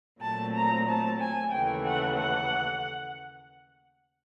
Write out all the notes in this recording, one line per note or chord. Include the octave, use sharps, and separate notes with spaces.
A#2 F#3 A3 C4 A5
A#5
A5
G#5
D#2 C#3 E3 A3 G5
F#5
F#5